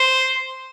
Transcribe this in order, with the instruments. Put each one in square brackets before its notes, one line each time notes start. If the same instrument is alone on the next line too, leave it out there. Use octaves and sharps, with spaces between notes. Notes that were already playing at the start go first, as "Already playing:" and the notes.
Already playing: [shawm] C5